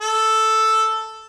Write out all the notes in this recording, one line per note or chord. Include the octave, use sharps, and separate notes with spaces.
A4